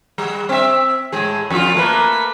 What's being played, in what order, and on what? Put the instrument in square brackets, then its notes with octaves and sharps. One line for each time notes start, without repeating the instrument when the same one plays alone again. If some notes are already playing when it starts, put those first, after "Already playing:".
[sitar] G3
C4 E5
A2 G#3 G#4
F2 F4
A3 A#3 B4